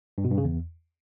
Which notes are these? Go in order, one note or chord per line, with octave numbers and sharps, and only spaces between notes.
G2
B2
G2
C#3
E2